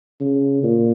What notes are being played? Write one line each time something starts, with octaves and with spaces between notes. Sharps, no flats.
C#3
A#2